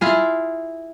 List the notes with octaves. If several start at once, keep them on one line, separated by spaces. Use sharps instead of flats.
E4 F4 G#4